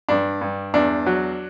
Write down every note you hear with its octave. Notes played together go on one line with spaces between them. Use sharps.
G2 D4
G2
E2 D4
F#3